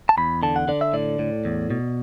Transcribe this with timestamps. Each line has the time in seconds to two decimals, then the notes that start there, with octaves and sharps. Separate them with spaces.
0.09 A5
0.17 E2 B5
0.43 D3 A5
0.56 F#5
0.68 D3 D5
0.81 E5
0.93 A2 D5
1.19 A2
1.45 E2
1.70 B2